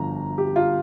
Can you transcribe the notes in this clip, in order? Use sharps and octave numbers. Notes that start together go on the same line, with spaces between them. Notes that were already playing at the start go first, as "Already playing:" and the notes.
Already playing: G1 F3 A#5
G4
F4